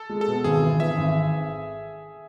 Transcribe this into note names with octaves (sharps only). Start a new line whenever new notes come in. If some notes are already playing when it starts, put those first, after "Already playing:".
Already playing: A4
G#3
A4
B2
G#1 G#4
E3
E3 E5
G#1